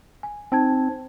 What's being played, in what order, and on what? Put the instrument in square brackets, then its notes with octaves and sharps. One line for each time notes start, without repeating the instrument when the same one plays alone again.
[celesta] G#5
[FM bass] C4 [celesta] D#4 A5 G#6